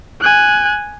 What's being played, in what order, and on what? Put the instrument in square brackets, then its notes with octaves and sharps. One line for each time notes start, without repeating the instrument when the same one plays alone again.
[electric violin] G#5 F#6